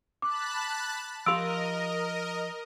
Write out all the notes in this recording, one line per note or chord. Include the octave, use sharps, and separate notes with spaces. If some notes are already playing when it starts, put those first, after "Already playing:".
A5 B5 D6 F#6
F3 G4 A#4 D#5 F5 C6 E6 D7